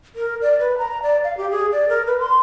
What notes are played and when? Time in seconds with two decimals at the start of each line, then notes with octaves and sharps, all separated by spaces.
0.15 A#4
0.42 D5
0.60 B4
0.78 A#5
1.03 D5
1.24 F5
1.37 G4
1.51 G#4
1.72 D5
1.89 A#4
2.07 B4
2.20 C6